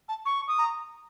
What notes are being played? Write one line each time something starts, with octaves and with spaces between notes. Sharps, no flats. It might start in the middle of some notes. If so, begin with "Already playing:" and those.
A5
C#6
D#6
A#5